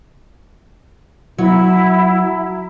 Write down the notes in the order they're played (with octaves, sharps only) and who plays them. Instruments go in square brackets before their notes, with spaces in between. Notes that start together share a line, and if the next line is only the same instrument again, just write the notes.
[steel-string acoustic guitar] F#3 [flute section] E4